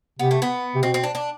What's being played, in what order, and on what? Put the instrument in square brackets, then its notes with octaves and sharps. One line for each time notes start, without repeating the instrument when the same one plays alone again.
[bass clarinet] C3 [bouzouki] B3
[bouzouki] A3
B3
[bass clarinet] C3
[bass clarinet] B2 [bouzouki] C4
[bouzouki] C4
D4
D4